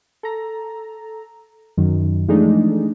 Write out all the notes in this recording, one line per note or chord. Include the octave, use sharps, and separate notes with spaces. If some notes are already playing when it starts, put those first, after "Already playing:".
A4 A#5
F#2 D#3
E3 F3 G#3 A3 D4 D#4